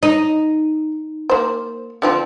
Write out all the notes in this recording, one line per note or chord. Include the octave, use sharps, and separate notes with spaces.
D#4 D#5
A#3 C5
D3 F3 C4